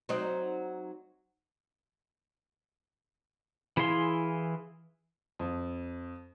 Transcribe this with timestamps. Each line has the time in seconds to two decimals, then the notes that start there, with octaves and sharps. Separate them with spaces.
0.09 F#3 C4 D#4
3.77 E3 E4 G#4 F5 C6
5.39 F2